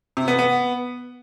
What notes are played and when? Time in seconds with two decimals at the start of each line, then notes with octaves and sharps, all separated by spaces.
0.17 C3
0.28 B3
0.39 B3